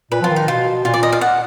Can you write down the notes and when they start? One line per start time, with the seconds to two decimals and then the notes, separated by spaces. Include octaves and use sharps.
0.11 A#2 B4
0.21 F3 F4
0.29 D#3
0.36 D#4
0.48 B2 F4
0.85 A#2 F4
0.94 D5
1.03 D#5
1.12 F5
1.21 F#5